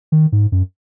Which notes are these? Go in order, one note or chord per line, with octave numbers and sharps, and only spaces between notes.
D#3
G#2
F#2